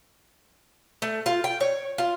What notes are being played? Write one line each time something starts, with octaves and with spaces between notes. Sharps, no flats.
A3
F4
G5
C#5
F4